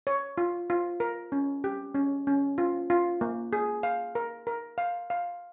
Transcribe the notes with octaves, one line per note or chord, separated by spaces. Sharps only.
C#5
F4
F4
A#4
C#4
G4
C#4
C#4
F4
F4
A#3
G#4
F5
A#4
A#4
F5
F5